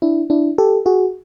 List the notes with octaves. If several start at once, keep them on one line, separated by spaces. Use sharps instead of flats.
D4 E4
D4 E4
G4 A4
F#4 G#4